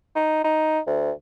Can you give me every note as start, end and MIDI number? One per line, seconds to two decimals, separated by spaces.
0.16 0.41 63
0.44 0.79 63
0.87 1.11 38